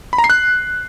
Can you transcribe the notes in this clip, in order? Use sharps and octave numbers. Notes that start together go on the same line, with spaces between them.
B5
A#5
C7
F#6